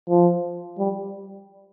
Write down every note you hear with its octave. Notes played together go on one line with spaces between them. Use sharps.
F3
G3